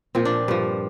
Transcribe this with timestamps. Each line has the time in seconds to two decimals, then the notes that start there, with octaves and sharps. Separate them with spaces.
0.15 A#2 F3 C4
0.25 D4
0.48 G2 F3